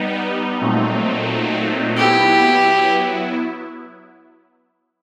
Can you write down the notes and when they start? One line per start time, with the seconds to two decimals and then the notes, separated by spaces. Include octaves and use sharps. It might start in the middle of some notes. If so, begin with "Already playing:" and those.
Already playing: G3 B3 D#4
0.60 A#2 F#3 A3 C4 D#4
1.97 F#3 B3 E4 G4